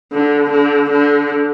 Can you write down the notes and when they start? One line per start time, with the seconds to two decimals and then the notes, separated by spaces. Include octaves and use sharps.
0.12 D3
0.51 D3
0.90 D3